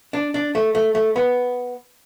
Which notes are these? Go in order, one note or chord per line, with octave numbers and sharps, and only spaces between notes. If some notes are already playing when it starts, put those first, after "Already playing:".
D4
D4
A3
A3
A3
B3